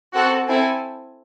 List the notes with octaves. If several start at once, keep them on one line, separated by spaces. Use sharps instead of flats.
C4 F#4 A4 F#5
C4 E4 A4 G#5